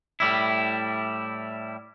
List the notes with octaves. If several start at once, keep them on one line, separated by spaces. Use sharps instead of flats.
A2 G3 E4